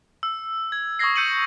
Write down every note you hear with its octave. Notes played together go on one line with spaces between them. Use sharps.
E6
G#6
C#6 D#6 E6 G#6 A#6 C7
E6 G6 C#7 D#7 F#7